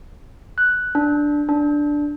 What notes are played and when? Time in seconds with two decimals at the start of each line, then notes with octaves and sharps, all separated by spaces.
0.58 F#6
0.95 D4
1.49 D4